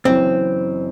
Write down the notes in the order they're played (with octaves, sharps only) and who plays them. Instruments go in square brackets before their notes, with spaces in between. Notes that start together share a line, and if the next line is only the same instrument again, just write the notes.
[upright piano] F#1 F#2 E3 [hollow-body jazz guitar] C4